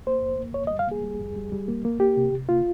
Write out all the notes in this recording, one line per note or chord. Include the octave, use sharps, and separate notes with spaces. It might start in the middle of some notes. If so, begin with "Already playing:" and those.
A#3 C5
F2
A#3
F2 C#5
G3 D#5
F5
A#3 G#4
G3
F2
G3
G3
A#3
A#3
A#3 G4
C3
C3
A#3 F4